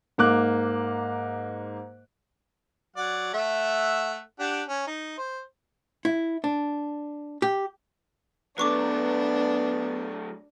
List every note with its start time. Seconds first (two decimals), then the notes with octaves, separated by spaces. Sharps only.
0.18 G#2 A#3 D6 F#6
2.96 F#3 D5 F#5
3.34 A3 E5 F#5
4.39 D4 G4 F#5
4.67 C#4
4.87 D#4
5.18 C5
6.05 E4
6.44 D4
7.42 G4
8.58 F#3 A3 B3 D4 B4 C#6 D6